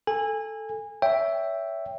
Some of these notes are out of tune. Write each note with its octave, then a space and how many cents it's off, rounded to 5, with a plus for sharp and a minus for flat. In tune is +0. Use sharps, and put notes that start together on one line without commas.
A4 +0 G#5 -25
C#5 +25 E5 +0 G5 +5